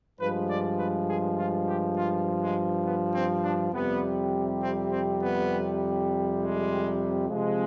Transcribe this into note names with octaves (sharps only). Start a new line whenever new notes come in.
G2 F3 G#3 B4
D5
B4
G#4
F4
G4
F4
G#3
B3
C4
D4
F2 C3 G3 B3
C4
C4
B3
G#3
C3 F3 G#3